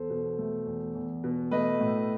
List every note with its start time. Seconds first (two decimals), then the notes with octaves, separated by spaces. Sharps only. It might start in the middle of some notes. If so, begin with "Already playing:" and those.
Already playing: E2 A4 C5
0.10 B2
0.38 A3
0.66 E2
0.95 E2
1.24 B2
1.51 A3 B4 D#5
1.80 A2